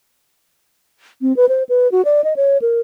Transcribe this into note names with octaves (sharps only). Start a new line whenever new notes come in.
C4
B4
C5
B4
F#4
D5
D#5
C#5
A#4